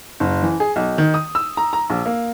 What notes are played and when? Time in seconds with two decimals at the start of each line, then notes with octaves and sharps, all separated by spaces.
0.20 F#1
0.43 E3
0.60 G#4
0.76 B1
0.98 D#3
1.14 D#6
1.35 E6
1.57 A#5
1.73 A#5
1.90 A#1
2.06 A#3